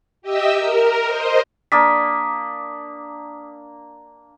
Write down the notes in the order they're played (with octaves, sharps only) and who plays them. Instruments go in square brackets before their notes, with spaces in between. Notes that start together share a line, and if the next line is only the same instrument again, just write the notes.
[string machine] G4 D#5 E5 E6
A#4
C5 D#5
[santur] A#3 D4 A5 [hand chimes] D6 D#6 B6